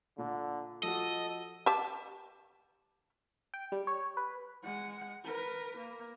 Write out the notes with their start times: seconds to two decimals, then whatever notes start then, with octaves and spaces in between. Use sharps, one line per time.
0.18 A#2 D3
0.83 F3 F#4 A4 D#5
1.66 G4 A5
3.54 G5
3.72 G3
3.87 C#5
4.17 B4
4.64 G#3 F#5
5.24 A#4 B4
5.78 A#3